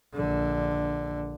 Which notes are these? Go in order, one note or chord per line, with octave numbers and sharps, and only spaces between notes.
A#1 D3